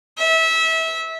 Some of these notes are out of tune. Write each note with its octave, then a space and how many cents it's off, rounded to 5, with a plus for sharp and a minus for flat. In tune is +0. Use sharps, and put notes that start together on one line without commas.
E5 -25